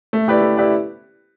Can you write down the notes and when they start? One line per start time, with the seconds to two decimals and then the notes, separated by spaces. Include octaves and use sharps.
0.13 A3
0.28 E4 G4 B4 D5
0.41 A3
0.57 E4 G4 B4 D5